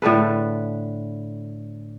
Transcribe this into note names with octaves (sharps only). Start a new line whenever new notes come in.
A2 D3 A4 B4